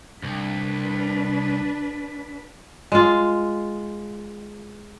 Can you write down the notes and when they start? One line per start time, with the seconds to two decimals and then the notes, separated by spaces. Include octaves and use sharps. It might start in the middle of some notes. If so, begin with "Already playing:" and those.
0.23 C2 D4 B4
2.92 G#3 F4